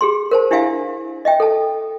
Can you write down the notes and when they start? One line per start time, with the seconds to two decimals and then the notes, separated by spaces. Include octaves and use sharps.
0.01 G4 G#4 C6
0.31 A#4 C5 A5
0.51 D4 E4 G4 E5 F5 G#5
1.25 D#5 E5 G5
1.40 A4 A5